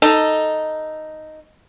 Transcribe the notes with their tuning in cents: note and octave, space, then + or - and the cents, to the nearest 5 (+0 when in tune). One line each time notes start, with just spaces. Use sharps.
D#4 +0 A4 +10